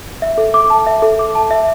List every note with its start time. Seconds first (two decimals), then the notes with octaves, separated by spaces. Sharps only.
0.22 E5
0.38 A4
0.54 D6
0.70 A5
0.86 E5
1.02 A4
1.19 D6
1.35 A5
1.51 E5